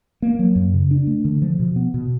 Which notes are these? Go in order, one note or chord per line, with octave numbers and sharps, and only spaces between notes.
A#3
F#3
F#2
C#3
D4
A3
D3
F3
B2
B3
B2